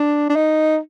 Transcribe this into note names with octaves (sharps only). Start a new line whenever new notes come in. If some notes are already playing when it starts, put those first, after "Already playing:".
Already playing: D4
D4
D#4